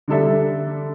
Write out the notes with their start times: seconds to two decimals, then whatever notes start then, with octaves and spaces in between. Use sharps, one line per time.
0.08 D3 G3 D4 A4 E5